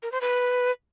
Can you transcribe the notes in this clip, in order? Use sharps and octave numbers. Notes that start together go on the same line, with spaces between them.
A#4
C5
B4